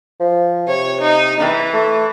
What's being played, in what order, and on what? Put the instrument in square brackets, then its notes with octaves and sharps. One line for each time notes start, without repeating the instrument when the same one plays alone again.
[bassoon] F3
[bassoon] C3 [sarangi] C#5
[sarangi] D#4
E3
[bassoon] A3